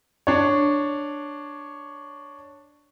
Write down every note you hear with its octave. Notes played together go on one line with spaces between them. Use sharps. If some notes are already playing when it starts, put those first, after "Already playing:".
D4 C#5